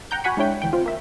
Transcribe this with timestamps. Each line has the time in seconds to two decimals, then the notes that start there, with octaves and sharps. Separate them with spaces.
0.11 F#5 G5 A#5 G6
0.24 F#4 F#5 G#5 B5 C#6
0.37 G#3 D4 E4 C#5 G5
0.62 D2 E3 G5
0.73 C4 F4
0.86 A#3 E5